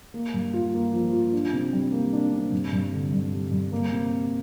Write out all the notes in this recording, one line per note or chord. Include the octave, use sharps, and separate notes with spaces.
A#3
G2
F4
A#3
F3
F4
D4
C3
G3
A#3
D4
C3
G2
G2
D3
G2
G3
G2
A#3
C3